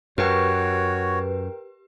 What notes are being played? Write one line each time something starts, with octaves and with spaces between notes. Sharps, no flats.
F#2 F#4 G4 A#4 B4 C#5 G5